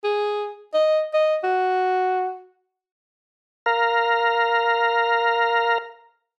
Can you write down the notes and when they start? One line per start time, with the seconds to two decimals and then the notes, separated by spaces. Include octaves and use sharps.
0.04 G#4
0.74 D#5
1.13 D#5
1.43 F#4
3.66 A#4 F5 A#5